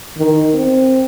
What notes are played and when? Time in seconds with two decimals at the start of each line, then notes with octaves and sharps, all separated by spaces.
0.18 D#3
0.55 C4